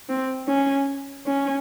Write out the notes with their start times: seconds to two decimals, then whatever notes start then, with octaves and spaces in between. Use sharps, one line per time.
0.09 C4
0.48 C#4
1.27 C#4